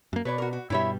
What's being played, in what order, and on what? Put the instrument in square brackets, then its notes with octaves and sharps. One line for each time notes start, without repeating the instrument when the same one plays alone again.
[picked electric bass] F#2 A#3
[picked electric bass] B2 [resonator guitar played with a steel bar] B4 C#5 D5
[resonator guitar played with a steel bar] F#4 A#4
F#4
[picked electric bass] G2 B2 G3 [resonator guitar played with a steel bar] E4 C#5 E5